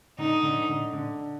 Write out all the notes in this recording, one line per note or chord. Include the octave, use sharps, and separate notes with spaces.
D3 D#4
D3
D3
D3